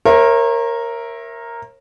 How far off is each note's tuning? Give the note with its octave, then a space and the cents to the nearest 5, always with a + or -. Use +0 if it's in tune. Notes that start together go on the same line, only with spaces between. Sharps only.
A#4 +0 C#5 -40 E5 +0